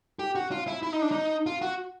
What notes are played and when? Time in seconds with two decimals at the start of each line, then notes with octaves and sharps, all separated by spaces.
0.19 G4
0.35 F#4
0.51 F4
0.68 E4
0.83 E4
0.93 D#4
1.02 D4
1.11 D#4
1.46 F4
1.62 F#4